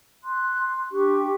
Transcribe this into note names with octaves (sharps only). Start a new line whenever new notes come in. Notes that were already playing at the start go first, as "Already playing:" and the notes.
C6 F#6
D4 G4 C#6